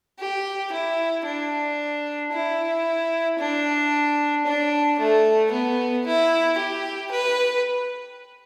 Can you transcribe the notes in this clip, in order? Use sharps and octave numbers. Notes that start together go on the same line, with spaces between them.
G4
E4
D4
E4
D4
D4
A3
B3
E4
G4
B4